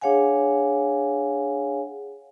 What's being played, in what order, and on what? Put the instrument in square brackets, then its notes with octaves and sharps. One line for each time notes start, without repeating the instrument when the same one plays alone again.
[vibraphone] D4 G#4 C#5 F5 F#5 G#5